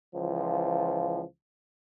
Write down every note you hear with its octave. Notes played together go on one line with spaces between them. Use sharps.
C#2 E3 F3